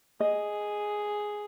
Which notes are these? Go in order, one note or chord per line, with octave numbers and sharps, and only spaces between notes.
G#4 D#5